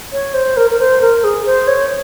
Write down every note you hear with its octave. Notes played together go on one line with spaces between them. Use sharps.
C#5
C5
A#4
A#4
C5
A#4
G#4
C5
C#5